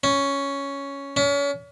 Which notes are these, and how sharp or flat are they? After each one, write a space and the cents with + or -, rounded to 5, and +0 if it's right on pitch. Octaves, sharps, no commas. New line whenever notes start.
C#4 +5
C#4 +35